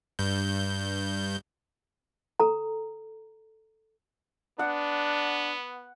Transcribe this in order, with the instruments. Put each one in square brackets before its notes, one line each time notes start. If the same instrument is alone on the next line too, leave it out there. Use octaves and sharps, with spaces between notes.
[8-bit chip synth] G2 G6
[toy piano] A4 A#5
[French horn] B3 [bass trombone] D4 [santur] F#5